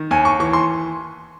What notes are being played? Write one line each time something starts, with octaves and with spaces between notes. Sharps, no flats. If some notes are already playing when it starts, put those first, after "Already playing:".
Already playing: D#3
D#2 G#5
C#6
E3 C#6
C6